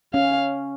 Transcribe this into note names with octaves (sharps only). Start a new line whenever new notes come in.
C#4 F5